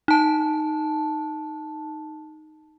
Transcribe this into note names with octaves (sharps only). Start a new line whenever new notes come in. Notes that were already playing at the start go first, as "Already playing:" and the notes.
D#4 A5